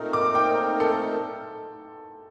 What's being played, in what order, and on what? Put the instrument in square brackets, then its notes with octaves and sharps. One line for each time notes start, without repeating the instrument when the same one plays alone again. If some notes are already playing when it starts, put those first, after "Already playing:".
Already playing: [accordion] A#2 A3 C4 D#4 A#4
[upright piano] D6
G5
A4